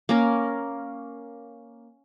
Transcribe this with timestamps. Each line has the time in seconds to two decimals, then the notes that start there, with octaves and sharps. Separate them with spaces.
0.09 A#3 C#4 A#4